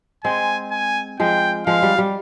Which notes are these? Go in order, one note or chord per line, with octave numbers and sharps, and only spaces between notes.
G#3 C4 G#5
G#5
F3 G#3 G5
F3 G#3 F5
G3
G3